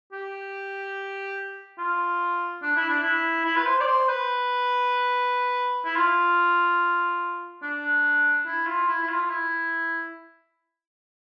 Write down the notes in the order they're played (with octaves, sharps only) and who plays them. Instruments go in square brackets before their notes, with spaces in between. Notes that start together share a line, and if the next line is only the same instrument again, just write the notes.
[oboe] G4
F4
D4
E4
D4
E4
E4
B4
C5
D5
C5
B4
E4
F4
D4
E4
F4
E4
E4
F4
E4